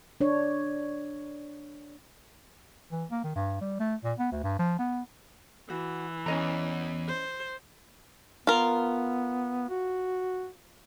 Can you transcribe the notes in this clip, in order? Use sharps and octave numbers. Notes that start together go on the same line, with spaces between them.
D4 C#5
E3
A#3
D#3
G2
G3
A3
A#2
B3
D2
G2
F3
B3
E3 F#4
E2 C#4 D#5 A#5
C5
B3 F4 A#4
F#4